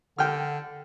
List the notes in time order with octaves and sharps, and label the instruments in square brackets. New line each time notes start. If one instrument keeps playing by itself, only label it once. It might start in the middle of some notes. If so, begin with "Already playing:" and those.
[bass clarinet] D3 [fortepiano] G5 F6